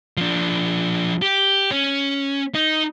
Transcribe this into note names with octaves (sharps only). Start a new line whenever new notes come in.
F3 D4
G4
C#4
D#4